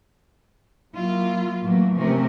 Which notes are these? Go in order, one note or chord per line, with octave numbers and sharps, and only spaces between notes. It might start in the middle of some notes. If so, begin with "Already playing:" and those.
F#3 A#3 E4 F4
A2 E3 F#3 A3 A#3
C3 E3 F3 A3 C#4 A#4